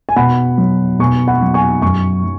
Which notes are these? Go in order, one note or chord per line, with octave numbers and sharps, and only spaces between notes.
G#5
B2 F#5 B5
F#3
B2 G#5 C#6
F#5 B5
F#3
G#5 C#6
F#2 G#5 C#6
F#3